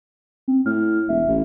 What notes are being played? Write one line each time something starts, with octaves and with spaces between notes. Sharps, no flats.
C4
A2 F6
E1 E5
A1